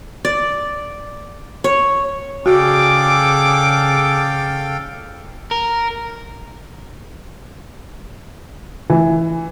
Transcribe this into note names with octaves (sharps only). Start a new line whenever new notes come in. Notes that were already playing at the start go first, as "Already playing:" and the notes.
D5
C#5
C#3 F#4 G#4 A4 D5 F5 G5 D6
A#4
E3